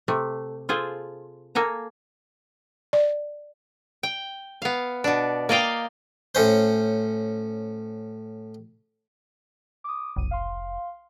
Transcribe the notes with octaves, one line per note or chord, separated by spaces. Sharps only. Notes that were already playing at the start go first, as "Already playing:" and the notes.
C3 A3
F4 G#4 A4 C5
A#3 A4 G#5 A#5
D5
G5
B3 F5
B2 D4
A#3 D5 D#5 F5 G5
A2 C#4 C5
D6 D#6
F1 B1 D#7
F5 C6